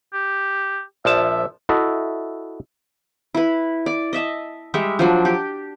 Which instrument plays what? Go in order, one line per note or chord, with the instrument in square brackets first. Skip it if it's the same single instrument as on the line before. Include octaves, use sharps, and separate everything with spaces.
[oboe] G4
[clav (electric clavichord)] A#1 F3 A5 [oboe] E5
[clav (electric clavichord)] E4 F#4 A4 D#5 E5
[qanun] E4 B4
D5
D#5 E5 A5
G3 G#3 E5
F3 F#3 D4
G4